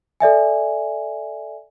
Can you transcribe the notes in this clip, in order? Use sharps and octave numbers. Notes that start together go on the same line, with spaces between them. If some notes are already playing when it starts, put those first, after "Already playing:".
A4 D5 E5 G#5